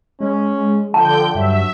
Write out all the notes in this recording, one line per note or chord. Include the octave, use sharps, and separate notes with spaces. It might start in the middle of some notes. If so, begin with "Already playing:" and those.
G#3 C#4
D3 F3 G5 A5 G6
G2 F#3 E5